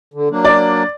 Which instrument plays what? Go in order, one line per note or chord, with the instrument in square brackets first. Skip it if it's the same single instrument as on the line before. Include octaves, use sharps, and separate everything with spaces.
[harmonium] D3
F#3 A#3 D4
[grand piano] D5